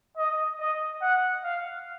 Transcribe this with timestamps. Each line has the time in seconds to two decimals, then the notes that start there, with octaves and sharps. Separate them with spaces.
0.17 D#5
0.60 D#5
1.02 F#5
1.44 F5